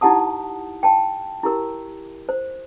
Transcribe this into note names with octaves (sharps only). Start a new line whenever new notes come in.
D#4 E4 G4 F#5 A5 D#6
G5 A5
E4 G4 A#4
C5